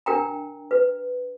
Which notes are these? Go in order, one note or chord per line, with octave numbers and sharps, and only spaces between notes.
D4 A#4 G5 A#5
B4